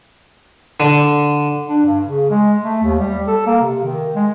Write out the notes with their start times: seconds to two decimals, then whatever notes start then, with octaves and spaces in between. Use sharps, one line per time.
0.80 D3
1.68 D4
1.86 G2
2.07 C#3
2.30 G#3
2.63 A3
2.83 D#2
2.99 G3
3.27 A4
3.47 A#3
3.62 C3
3.84 D#3
4.15 G#3